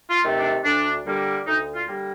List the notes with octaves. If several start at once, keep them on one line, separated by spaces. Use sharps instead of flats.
F4
C3 D#3 A3
D4
D2 D4
D3 G3 A#3
D2 D#4
F4
D3 G3 A#3